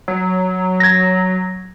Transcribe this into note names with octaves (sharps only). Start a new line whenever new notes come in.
F#3
G#6 A#6